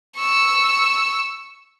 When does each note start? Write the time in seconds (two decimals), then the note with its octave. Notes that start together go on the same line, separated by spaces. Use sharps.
0.17 C#6 E6